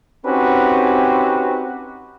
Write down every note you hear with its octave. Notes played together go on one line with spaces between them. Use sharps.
C4 C#4 D#4 F#4 G4 B4